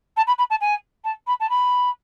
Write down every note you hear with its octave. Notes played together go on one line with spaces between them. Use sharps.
A5
B5
B5
A5
G#5
A5
B5
A5
B5